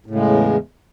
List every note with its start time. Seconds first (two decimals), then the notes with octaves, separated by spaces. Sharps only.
0.06 A2
0.11 C#3
0.15 G#3
0.20 E2